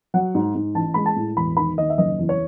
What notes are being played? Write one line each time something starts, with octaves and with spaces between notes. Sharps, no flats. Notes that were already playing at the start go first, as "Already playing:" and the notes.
F#3 F#5
G#2
G#2
A1 A5
G#3 B5
A5
A2
E1 B5
D#3 B5
D#2 D#5
E5
F#1 D#5
E2
C#5